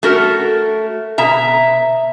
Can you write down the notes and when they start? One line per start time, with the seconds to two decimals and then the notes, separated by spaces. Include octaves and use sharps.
0.03 A3 F#4 A#4
1.18 B2 E5 A#5